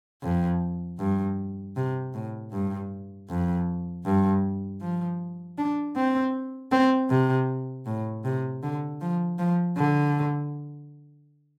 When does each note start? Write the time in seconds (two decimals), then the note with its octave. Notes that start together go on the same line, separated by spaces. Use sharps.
0.23 F2
0.99 G2
1.76 C3
2.14 A2
2.52 G2
3.29 F2
4.05 G2
4.81 F3
5.58 D4
5.96 C4
6.72 C4
7.10 C3
7.86 A2
8.24 C3
8.63 D3
9.01 F3
9.39 F3
9.77 D3